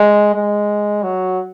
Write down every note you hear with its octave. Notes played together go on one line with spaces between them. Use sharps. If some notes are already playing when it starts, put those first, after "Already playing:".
Already playing: G#3
G#3
F#3